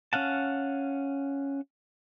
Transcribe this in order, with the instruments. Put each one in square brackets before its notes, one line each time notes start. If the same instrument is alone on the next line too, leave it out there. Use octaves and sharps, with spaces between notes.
[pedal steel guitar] C#4 F5 F#5 A5